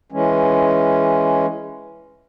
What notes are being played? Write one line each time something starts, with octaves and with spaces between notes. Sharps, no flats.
E3 G#3 C#4